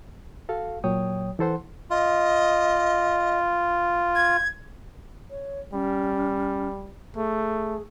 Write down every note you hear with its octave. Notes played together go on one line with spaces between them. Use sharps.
F#4 A4 F5
A#2 F#3 C#5 G5 D#6
E3 E4 A4 C5 F#5 C6
F4 D#5
G#6
C#5
G3 C#4
A3 G#4